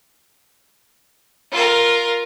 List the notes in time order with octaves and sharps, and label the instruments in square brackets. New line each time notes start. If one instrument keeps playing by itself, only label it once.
[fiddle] F4 A#4